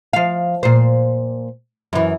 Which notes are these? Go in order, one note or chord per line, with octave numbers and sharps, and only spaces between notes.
F3 F5
A#2 C5
F#2 E3